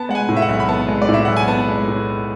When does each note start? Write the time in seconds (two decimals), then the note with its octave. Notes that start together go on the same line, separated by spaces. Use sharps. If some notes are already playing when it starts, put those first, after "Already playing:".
Already playing: B3 A5
0.09 G#3 F#5
0.15 G#5
0.29 A2
0.37 E5
0.42 F#5
0.49 B1
0.60 B5
0.69 B3 A5
0.88 G#3
1.02 D5
1.09 A2
1.14 E5
1.25 B1 F#5
1.37 G#5
1.48 B3 A5
1.68 G#3
1.88 A2